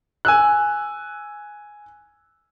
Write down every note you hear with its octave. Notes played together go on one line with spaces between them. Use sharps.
G#5 E6 F#6